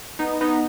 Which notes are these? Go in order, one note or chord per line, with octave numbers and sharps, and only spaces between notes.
B3 D#4
B3 D#4